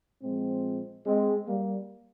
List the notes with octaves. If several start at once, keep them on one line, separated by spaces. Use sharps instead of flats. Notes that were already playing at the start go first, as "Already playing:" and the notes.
A#2 F3 G#3 C4
G#3 C4
G3 A#3